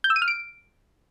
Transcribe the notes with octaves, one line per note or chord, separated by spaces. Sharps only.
G6
E6
D#7
F6
D7